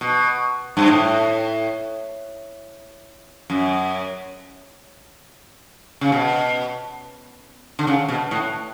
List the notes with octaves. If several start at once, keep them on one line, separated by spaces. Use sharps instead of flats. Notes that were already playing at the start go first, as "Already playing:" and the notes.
B2
G2
A2
F#2
C#3
B2
D3
C#3
B2
A2